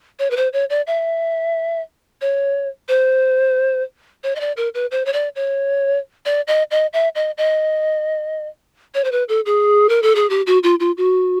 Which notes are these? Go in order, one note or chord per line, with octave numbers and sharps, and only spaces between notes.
C#5
B4
C5
C#5
D5
E5
C#5
C5
C#5
D#5
D5
A#4
B4
C5
C#5
D5
C#5
D5
D#5
D#5
E5
D#5
D#5
C#5
C5
B4
A4
G#4
A#4
A4
G#4
G4
F#4
F4
F4
F#4